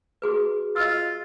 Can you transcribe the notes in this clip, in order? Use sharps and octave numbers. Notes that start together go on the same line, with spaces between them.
F#4 G#4 B4
F4 D#5 E6